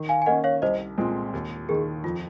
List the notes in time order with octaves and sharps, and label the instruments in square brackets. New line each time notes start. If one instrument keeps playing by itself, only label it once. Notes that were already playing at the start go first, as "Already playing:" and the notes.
Already playing: [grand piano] D#3
[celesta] F5 G#5
G#5
[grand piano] A#3 C#4 [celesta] D#5 F#5
[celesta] C#5 F5
[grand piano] C2 [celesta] C5 D#5
[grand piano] A#2 G#3 C4
D#2
[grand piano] D#3 A#3 [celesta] G#4
[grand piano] F2 [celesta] F4